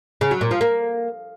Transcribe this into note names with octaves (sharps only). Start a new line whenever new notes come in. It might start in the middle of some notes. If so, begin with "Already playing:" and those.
C#3
F#3
A#2
F3
A#3